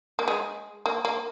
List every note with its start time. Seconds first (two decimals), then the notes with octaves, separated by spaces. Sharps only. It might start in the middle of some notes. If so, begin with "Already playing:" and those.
0.19 A#3
0.28 G#3
0.86 A#3
1.05 A#3